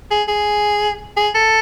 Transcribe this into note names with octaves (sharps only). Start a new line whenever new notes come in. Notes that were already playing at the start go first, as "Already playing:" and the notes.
G#4
G#4
G#4
A4